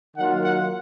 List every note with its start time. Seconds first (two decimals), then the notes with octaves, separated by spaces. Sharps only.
0.17 D#3 F#3 A#3 F4 F#5
0.44 F#5